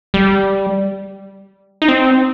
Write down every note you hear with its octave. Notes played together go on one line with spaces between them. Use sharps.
G3
D#4
C4